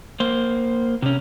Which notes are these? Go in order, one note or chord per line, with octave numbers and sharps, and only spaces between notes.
A#3 C5
C3 C#4